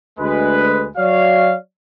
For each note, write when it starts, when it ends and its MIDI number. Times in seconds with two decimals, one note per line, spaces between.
0.19 0.86 38
0.19 0.86 56
0.19 0.86 71
0.97 1.54 54
0.97 1.54 66
0.97 1.54 73
0.97 1.54 74
0.97 1.54 77